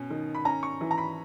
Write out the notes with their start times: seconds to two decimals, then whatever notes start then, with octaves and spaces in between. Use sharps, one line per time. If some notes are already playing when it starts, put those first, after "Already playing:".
Already playing: B2 C#4
0.10 D#3
0.35 B5
0.45 C#4 A#5
0.63 C#6
0.81 E3
0.91 A#5
0.98 B5